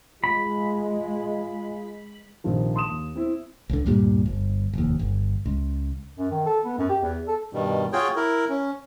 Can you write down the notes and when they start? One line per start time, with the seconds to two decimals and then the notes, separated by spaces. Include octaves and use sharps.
0.24 G#3 F4 B5
2.44 A#1 C3 D#3 F3
2.74 A5 C6 D#6 E7
2.89 D#2
3.15 C4 E4
3.70 C#2 D3
3.86 D2 G2 A#2 G3
4.26 G1
4.73 F1 D#2
4.99 G1
5.46 C#2
6.18 F#2
6.31 D#3
6.46 A4
6.65 B3
6.78 F#2
6.89 G4
7.02 E2
7.28 A4
7.53 G2 B2 D#3 G3
7.93 F4 F#4 G#4 C#5 G5
8.16 E4 A#4
8.49 C#4